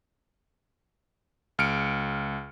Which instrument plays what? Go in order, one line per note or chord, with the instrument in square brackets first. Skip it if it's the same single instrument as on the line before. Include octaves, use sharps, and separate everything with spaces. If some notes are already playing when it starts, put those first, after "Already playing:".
[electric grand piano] C#2 F6 C#7 D7